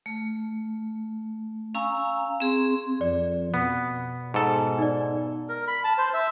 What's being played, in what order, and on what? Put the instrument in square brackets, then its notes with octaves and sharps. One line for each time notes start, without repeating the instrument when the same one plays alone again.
[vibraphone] A3
C#4 F5 G#5 A#5 C#6 E6
C4 G#4 C6
[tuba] F2 [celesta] D5
[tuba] B2 [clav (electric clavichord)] B3
[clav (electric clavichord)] G#2 A4
[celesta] D#4 D5
[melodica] A#4
B5
A5
C5
E5